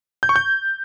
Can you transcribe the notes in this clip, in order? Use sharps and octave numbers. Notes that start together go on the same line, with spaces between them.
G6
C#6
G6